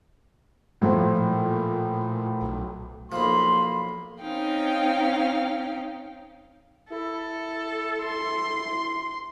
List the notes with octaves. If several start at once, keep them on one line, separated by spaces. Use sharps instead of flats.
A2 F3 F#3 A3
A#2
B1
B1 F3 A#3 B5 C6
C4 C#4 D#4 F5 G5
E4 A4
C6